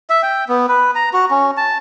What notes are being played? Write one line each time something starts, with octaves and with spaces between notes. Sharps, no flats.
E5
G5
B3
B4
A#5
F#4
C#4
A5